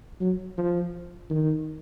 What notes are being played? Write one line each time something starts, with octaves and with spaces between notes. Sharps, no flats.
F#3
F3
D#3